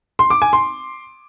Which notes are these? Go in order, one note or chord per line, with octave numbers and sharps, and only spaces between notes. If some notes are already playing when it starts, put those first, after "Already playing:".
C6
D6
G#5
C6